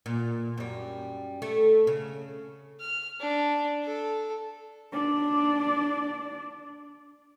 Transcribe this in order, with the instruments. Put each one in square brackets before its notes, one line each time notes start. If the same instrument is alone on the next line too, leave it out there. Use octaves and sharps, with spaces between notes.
[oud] A#2
F#2 G3
A3
C#3
[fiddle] F6
D4
A4
[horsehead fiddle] D4 D5